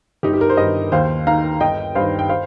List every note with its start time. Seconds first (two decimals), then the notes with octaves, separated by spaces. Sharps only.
0.23 G1 D#4 G4
0.33 G4
0.41 A#4
0.50 C5
0.57 G2 D#3 A#4 D#5
0.92 D#2 C5 F5
1.27 D#3 F5 A#5
1.61 G1 D#5 G5
1.95 G2 D#3 C5 F5
2.19 G5
2.29 C5 F5